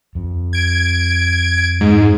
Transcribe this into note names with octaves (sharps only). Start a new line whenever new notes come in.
F2
G#6 D7
G#2